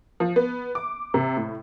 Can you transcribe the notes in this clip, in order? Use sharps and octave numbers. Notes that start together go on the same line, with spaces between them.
F3
B3
D6
C3
A2